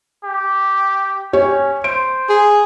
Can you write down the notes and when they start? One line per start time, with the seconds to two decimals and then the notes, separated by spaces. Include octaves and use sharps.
0.24 G4
1.33 C#4 G4 C#5
1.84 C5 D7
2.29 G#4